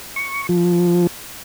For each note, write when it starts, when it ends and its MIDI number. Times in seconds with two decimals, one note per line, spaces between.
0.16 0.47 85
0.49 1.07 53